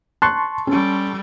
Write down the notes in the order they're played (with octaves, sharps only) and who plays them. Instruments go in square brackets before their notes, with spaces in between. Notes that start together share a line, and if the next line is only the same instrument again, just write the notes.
[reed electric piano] A5 C6 C#6 [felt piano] F#6
[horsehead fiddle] G3 A4 [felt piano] C#4